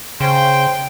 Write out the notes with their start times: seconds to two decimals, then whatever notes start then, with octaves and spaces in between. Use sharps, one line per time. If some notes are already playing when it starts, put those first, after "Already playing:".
0.20 C#3 C5 G5